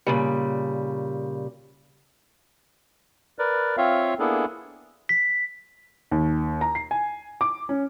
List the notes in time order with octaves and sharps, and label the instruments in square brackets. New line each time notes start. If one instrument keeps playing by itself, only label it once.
[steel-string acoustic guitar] A#2 C#3 G3
[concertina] A#4 B4 D5
C4 F4 C#5 E5 F5
A#3 B3 D4 E4 G#4 A4
[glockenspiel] B6
[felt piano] D#2
A#5
C7
G#5
D6
C#4